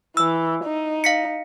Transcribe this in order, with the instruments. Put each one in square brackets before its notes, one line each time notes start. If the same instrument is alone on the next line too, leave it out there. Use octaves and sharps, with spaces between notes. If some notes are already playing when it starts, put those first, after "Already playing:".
[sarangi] E3 [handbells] E6
[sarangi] D#4
[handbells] F5 B6 C#7